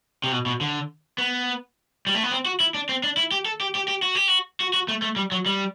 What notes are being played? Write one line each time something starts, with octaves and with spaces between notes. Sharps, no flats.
C3
B2
B2
D3
B3
G3
A3
B3
C4
F#4
E4
D4
C4
D4
E4
G4
A4
G4
G4
G4
F#4
G4
F#4
F#4
F#4
A3
A3
G3
F#3
G3